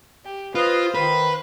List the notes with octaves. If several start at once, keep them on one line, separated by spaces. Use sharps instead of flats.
G4
F4 B4 C5 D#5 F5
D#3 B4 B5